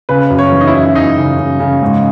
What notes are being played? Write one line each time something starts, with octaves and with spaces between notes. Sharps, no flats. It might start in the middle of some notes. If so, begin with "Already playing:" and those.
C#3 B4
F#2
C#5
E3
D#4
E4
F#2
F#2 D#4
C#3
C#3
C#3
G#2